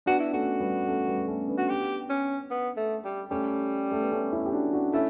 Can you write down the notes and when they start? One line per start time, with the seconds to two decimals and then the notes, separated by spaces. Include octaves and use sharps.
0.06 B3 D4 F#4
0.20 E4
0.33 A3 C#4 F#4
0.60 G3 B3
0.87 A3 C#4
1.08 G3 B3
1.28 A3 C#4
1.48 B3 D4
1.58 F#4
1.69 G4
2.10 C#4
2.50 B3
2.77 A3
3.04 G3
3.31 G3 A3 C#4
3.91 A3
4.02 B3
4.12 A3 C#4
4.32 C#4 E4
4.46 G4
4.52 D4 F#4
4.73 D4 F#4
4.93 A3 C#4 E4